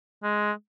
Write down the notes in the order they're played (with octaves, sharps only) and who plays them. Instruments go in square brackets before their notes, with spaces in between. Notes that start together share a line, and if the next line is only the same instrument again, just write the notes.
[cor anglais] G#3